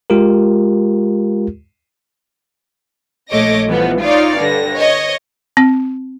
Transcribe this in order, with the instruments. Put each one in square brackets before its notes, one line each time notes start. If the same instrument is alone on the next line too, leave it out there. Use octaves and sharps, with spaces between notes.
[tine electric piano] G#3 F4 G4 A#4
[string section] A#1 A3 C#5 D#5 D6 A#6
E3 F3 G3 B3
D#4 F4 C#5 D5 F5
G2 D3 A#6
C#5 D#5
[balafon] C4